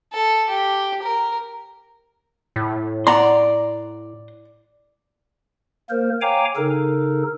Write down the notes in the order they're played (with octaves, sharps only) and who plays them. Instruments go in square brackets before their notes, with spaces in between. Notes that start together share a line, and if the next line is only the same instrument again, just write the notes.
[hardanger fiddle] A4
G4
A#4
[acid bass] A2
[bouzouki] D5 [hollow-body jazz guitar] F#5 A#5 C6
[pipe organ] A#3 A#4 C5
C#5 F5 G5 G#5 A#5 D6
C#3 D#4 A4 A#4